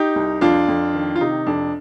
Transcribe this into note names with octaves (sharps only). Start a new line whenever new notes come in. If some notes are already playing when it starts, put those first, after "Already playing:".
Already playing: D#4 G4
C2
F2 D4 F4
F2
D#3
F4
C3 D#4
F2 D4